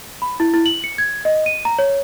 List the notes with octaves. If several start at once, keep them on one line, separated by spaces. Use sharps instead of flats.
B5
E4
E4
F#7
C#7
G#6
D#5
D#7
A#5
C#5